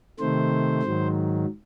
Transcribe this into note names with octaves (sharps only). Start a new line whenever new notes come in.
C3 D#3 A3 C5
G#2 D#3 F#3